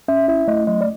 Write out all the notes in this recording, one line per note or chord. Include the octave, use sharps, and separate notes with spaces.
C#4 E5
E4 E5
A3 D#5
F#3 D#5
D5